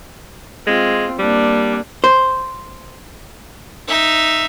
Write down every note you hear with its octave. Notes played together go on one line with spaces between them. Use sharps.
G#3 C4 F4
G3 A#3 D4
C5
D#4 E5